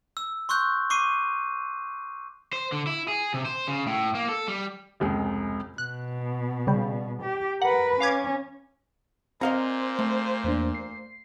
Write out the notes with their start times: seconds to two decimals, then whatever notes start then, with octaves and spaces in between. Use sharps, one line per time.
0.17 E6
0.49 C6 C#6 E6 F#6 G6
0.90 C#6 D6 C7 D#7
2.53 C5
2.72 D3
2.87 E4
3.08 G#4
3.34 C3
3.45 C5
3.68 C#3
3.87 A2
4.15 A#3
4.29 A4
4.48 G3
5.00 F1 C#2 G#3
5.78 B2 F#6
6.67 C#3 G3
7.22 G4
7.62 A#4 B4 F#5
8.00 C#4 F5 D6 G#6
9.41 A#2 C4 C5 D#5 F5 A#5
9.99 A3
10.44 E2 A#3 D4
10.75 C7